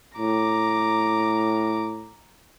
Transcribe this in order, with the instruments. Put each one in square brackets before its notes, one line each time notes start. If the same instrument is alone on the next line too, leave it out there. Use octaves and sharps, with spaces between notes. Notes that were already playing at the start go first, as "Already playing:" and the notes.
[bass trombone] A2 [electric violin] A#5 D6